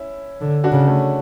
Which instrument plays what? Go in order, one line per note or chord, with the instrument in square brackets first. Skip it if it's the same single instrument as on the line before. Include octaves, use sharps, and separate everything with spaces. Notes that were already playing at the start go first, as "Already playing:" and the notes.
Already playing: [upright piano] C#4 E4
[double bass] D3
[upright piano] D4 F#4
[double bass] C#3
[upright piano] A3 C#4